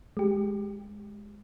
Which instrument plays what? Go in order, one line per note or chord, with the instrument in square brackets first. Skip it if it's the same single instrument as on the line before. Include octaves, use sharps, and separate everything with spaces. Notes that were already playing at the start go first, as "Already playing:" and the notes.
[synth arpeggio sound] G#3 G4